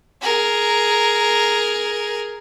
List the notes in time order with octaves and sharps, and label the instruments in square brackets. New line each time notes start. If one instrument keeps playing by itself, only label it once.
[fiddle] G#4 A#4